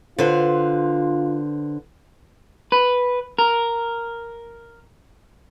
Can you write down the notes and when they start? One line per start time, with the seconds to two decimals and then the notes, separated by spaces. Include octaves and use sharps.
0.18 D3 F4 B4 C5
2.72 B4
3.39 A#4